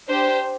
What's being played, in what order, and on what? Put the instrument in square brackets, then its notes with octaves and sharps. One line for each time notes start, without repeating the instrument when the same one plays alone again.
[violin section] D4 G4 C5